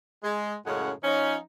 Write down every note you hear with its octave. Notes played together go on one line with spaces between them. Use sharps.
G#3
F#2 A2 C#3 G#3 C#4 F#5
F3 C#4 D#4